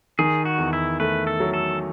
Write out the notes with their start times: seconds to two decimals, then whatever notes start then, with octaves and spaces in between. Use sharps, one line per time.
0.19 D#3 G#4
0.45 F#4
0.58 E2
0.73 E4
1.00 A3 B4
1.27 A4
1.40 F#3
1.54 A4